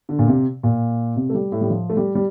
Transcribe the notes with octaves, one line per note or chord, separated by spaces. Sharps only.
D3
A#2
C3
A#2
C3
A3
G3
A2
G3
F3
A3
G3
G3